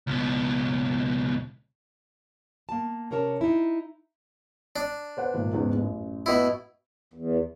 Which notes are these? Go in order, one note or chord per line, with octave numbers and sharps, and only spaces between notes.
C#2 B2
A#3 A5
C3 C#4 A#4 C#5 A5
D#4 E4
D4
B4 C5 F#5
G#1 A#2
E2 G#2 C#3
A1 F#2
B2 E4
E2